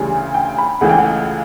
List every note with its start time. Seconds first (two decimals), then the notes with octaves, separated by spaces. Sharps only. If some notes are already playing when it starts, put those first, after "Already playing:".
Already playing: D2 C#3 E3 G3
0.34 G5
0.58 B5
0.81 C#2 C#3 E3 A3 F#5
0.89 G5
0.98 F#5